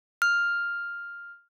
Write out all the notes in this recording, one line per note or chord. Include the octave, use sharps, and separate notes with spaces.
F6